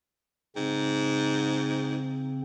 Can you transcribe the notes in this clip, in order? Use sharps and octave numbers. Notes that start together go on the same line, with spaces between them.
G#2 C#3 C4